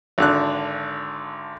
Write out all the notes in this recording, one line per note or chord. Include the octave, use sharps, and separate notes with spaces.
G#1 D3 F#6